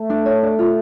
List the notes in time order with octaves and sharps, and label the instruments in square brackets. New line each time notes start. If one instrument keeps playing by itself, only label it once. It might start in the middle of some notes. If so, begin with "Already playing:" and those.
Already playing: [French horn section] A3
[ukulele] D4
C#5
D4
F4